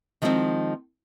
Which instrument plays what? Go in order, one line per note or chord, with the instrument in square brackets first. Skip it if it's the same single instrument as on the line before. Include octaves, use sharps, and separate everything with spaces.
[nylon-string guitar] D#3 F3 G#3 A3 C4 D#4